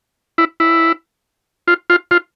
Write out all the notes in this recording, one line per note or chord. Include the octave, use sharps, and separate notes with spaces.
E4
E4
F4
F4
F4